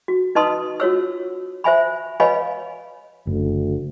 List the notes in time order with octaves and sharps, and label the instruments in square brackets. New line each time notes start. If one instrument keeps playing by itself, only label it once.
[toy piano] F#4
D#4 B4 D#5 A5 C6 D#6
F4 F#4 C#5 E6
C5 E5 G#5 B5
B4 C#5 D#5 F5 G#5 B5
[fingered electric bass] F#1 [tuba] D2